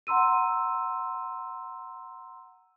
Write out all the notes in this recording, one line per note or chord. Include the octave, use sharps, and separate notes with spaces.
F#5 A#5 C6 E6 D#7